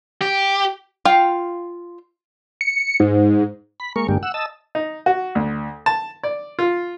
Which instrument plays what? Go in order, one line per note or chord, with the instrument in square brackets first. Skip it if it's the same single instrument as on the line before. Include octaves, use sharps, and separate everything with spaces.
[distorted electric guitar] G4
[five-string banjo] F4 F5 G5
[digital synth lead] C#7
G#2
[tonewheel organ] B5
G#3 A#3 A#4 C#6
G2 D3 G#3 A#3 G4
F#5 E6
D#5 A5 E6
[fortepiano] D#4
F#4
D2
A5
D5
F4